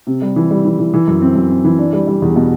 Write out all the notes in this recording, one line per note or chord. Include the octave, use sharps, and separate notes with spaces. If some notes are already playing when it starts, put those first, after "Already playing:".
C3
G3
E3
G3
E3
E3
E3
F#2
C4
F#2
C4
E3
D4
G3
G3
E2
B2